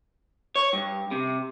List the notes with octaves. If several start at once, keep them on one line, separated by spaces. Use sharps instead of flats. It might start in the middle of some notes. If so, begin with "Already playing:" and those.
C#5
G2
C3